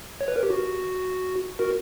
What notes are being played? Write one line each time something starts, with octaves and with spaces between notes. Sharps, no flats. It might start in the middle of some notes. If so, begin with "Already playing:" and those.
C#5
B4
A#4
G4
F#4
F#4 A#4